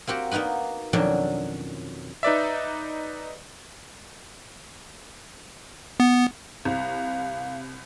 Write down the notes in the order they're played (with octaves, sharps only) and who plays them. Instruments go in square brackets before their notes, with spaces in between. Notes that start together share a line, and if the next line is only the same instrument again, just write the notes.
[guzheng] A#3 C4 F#4 G4
A#3 B3 D#4 F#4 B4
F2 B2 D#3 F#3 C#4 D4
[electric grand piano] D#4 B4 D5 E5
[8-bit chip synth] B3
[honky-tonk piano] C2 [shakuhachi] F5